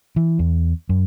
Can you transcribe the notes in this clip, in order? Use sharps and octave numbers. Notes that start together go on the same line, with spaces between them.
E3
E2
F#2